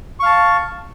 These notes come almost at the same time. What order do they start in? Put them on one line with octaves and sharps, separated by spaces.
C#6 F5 A5